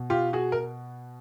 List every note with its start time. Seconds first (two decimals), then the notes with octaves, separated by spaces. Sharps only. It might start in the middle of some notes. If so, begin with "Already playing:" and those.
Already playing: B2
0.10 F4 G4
0.33 F#4 G#4
0.52 A#4